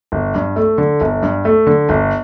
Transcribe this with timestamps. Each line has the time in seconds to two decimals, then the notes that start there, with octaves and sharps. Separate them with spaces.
0.12 G1
0.35 G2
0.56 A3
0.78 D3
1.01 G1
1.23 G2
1.45 A3
1.67 D3
1.89 G1